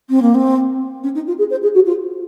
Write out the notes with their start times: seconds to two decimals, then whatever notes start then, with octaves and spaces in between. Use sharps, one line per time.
0.10 C4
0.22 A#3
0.34 C4
1.04 C#4
1.15 D#4
1.27 F4
1.38 G#4
1.50 C5
1.63 G#4
1.74 F#4
1.86 F4